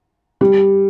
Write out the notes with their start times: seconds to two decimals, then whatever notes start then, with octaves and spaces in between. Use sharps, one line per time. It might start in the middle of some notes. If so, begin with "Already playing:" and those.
0.41 G3